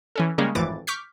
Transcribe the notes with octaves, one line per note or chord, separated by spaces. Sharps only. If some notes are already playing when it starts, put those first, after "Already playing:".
E3 C#4 A4
C#3 G3 G#3 A#3 C#4
G#1 F2 A2 E3 D6 A6
C#6 D6 F6 G6 B6